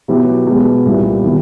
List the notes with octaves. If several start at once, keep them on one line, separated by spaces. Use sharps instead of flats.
B2 F#3 B3 E4 G4
B2 G#3 B3
C2 A#2 G3 B3 E4
C3 D#3 F#3 B3 E4